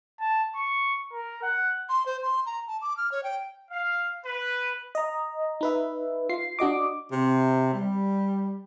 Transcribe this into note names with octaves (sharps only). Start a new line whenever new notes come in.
A5
C#6
A#4
F#5
C6
C5
C6
A#5
A5
D6
F6
C#5
G5
F5
B4
D#5 A#5
D#4 B4 E5
F4 C7
D4 F#4 D#5 D6
C3
G3